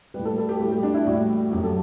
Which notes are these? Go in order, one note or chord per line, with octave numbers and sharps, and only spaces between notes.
A2 G3 B4
A4
A4
G4
A2 G3 F#4
G4
D4
E4
A2 E3 G3 F#4
F#2 F#3 G4
A4